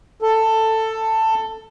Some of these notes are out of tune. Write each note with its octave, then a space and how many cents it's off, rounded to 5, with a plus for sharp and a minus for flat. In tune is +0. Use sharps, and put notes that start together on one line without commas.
A4 +10